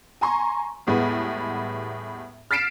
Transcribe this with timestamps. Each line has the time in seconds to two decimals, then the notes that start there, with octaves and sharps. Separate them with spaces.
0.21 G#5 A#5 C6 C#6
0.87 E2 A2 G3 G#3 B3
2.51 F6 A6 B6 C7 D7 E7